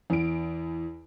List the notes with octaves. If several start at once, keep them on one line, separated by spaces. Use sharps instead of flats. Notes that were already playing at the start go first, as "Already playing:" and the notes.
E2 D7